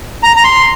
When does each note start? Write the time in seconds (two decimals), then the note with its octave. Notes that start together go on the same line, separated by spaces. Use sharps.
0.23 A#5
0.36 A#5
0.44 C6